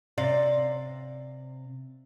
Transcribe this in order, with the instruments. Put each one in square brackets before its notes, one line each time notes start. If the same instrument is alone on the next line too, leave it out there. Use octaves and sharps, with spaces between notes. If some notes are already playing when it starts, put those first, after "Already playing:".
[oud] C3 D5 F5